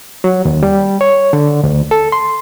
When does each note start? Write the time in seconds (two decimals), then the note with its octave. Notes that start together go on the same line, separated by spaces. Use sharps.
0.24 F#3
0.45 D#2
0.63 G3
1.01 C#5
1.33 D3
1.63 D2
1.91 A4
2.12 C6